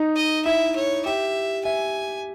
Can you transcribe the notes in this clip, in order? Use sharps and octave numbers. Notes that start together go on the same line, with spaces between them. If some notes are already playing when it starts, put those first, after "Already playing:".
Already playing: D#4
D#5
E4 E5
C#5
G4 E5
E5 G#5